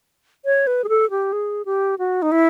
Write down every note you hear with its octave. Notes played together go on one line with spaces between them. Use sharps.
C#5
B4
G#4
A4
G4
G#4
G4
F#4
D#4
E4